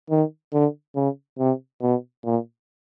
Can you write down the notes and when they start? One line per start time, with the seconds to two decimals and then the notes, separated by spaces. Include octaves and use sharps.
0.10 D#3
0.53 D3
0.95 C#3
1.39 C3
1.82 B2
2.24 A#2